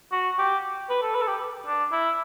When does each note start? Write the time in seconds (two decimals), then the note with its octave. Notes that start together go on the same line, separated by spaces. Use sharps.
0.12 F#4
0.39 G4
0.90 B4
1.03 A4
1.15 B4
1.22 A4
1.28 G4
1.66 D4
1.92 E4